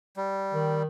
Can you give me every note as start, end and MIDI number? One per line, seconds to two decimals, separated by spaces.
0.17 0.83 55
0.54 0.87 51